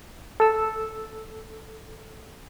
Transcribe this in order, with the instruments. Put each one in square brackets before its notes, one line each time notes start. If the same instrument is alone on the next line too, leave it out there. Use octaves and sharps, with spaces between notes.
[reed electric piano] A4 E6